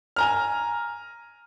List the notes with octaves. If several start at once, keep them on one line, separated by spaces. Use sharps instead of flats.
G#5 A#5 F6